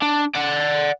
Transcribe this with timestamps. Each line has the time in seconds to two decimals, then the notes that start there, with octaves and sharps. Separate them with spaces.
0.02 D4
0.35 D5 F#5